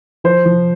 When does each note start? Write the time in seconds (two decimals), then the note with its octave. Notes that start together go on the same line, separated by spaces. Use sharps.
0.24 F3 C5
0.46 F3